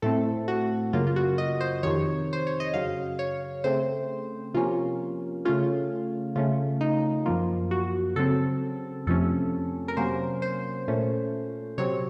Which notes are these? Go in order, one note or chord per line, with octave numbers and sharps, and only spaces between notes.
A2 A3 C4 A4
F#4
F#2 C#3 F#3 A#3 F4
F4
F#4
D#5
C5
F2 C3 D#3 C#5
C5
C#5
D#5
F#2 C#3 F#3 F5
C#5
C#3 A3 C4 C5
C3 F3 A#3 C#4 F4
C#3 A3 C#4 F4
C#3 A3 C#4 F4
D#4
F#2 F3 A#3 F4
F#4
C#3 F#3 C4 A4
F2 C3 F3 A3 C#4 A4
A#4
C3 F#3 A#3 C#4 C5
C5
A#2 A3 C#4
C3 F#3 C4 C#5